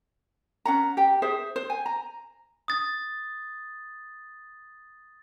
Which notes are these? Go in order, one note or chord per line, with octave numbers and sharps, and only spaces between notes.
C#4 F#5 A#5
G4 G5
G#4 C5 E5
C5
G#5
A#5
D#6 A6